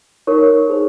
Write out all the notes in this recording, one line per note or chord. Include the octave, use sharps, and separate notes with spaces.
D#4 A#4 C#5 C#6
D#4 G#4 C5